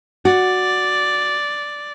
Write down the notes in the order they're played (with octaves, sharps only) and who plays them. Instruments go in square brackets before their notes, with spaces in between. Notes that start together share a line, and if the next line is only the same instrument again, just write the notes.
[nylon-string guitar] F#4 [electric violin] D5